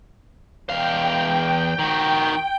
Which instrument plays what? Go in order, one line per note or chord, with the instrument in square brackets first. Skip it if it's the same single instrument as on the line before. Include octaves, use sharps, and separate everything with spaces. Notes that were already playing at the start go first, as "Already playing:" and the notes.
[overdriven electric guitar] E2 F5 [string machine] G5
[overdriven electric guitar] D#3 F#4